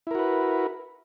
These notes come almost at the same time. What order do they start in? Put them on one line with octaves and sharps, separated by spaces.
E4 A#4 F#4 B4